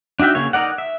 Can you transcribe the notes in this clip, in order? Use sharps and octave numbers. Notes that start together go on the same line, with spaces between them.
D4 D#4 F#4 E5 G5
C#3 A#3 C#5
D#4 A#4 D5 F#5
E5